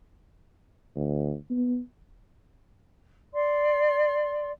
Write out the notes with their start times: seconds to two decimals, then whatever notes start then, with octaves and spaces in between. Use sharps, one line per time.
0.96 D2
1.50 B3
3.33 D5 C6